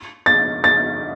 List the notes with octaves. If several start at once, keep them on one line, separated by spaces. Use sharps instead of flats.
A6
A6